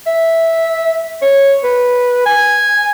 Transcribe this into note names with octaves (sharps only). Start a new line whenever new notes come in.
E5
C#5
B4
G#5